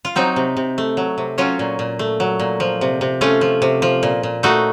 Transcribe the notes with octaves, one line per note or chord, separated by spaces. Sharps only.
F4
F#3 C4 D#4
C3
C3
A3
F#3
C3
F#3 C#4 F4
A#2
A#2
A3
F#3
A#2
F3
C3
C3
A3 C#4 F4
F3
C3
F3
A#2
A#2
A3 D#4 F#4